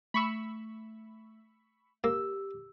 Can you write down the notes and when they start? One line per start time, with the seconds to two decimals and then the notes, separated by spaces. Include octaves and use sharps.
0.14 A3 B5 C#6 E6
2.04 A#3 G4 E6